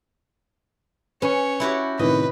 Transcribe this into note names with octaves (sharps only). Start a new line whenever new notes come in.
C#4 B4 C#5
E4 F#4 G4
A2 C3 D#3 B4 D#5